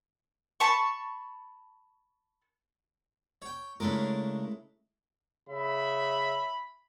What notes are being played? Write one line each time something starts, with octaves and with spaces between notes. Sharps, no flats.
A5 B5 C#6
C#5 G5
C#3 G#3 A3 D4 E4 A#4
C#3 E5 B5